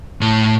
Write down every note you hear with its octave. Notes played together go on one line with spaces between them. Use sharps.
A2